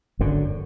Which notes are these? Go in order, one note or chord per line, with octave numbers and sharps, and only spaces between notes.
G#1 F#2 D3